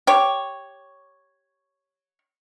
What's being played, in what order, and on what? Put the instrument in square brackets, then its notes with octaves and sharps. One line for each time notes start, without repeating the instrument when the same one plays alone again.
[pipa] G4 C#5